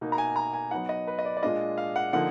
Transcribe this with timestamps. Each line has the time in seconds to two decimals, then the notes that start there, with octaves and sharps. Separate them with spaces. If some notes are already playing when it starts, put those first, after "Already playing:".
0.01 B2 A#3 D#4
0.12 A#5
0.18 G#5
0.36 A#5
0.53 G#5
0.71 F#3 B3 D#4 F#5
0.89 D#5
1.07 B4
1.19 D#5
1.25 D5
1.37 D5
1.42 A#2 G#3 D4 F4 D#5
1.78 F5
1.96 F#5
2.13 D3 F3 A#3 D#4 F#5